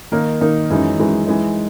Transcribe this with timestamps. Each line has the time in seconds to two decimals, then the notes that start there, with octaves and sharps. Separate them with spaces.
0.12 D#3 A#3 D#4 A#4
0.41 D#3 A#3 D#4 A#4
0.70 F#2 E3 G#3 D#4
0.98 F#2 E3 G#3 D#4
1.27 E3 G#3 D#4